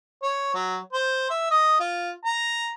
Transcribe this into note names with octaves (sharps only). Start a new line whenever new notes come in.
C#5
F#3
C5
E5
D#5
F4
A#5